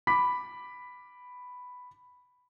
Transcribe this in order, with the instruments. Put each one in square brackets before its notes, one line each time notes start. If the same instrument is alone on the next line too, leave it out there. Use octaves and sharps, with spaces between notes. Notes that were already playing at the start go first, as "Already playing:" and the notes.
[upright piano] B5 D6 B6